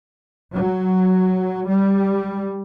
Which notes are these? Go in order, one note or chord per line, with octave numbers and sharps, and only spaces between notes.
F#3
G3